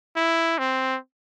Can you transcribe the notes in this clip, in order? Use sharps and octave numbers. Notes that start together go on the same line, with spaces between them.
E4
C4